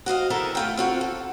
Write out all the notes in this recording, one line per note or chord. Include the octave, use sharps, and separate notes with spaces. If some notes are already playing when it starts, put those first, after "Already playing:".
F#4 C5 D#5 F5
E2 E3 A4 A#4 E5 A5
A3 F4 G5
C4 F4 F#4
A4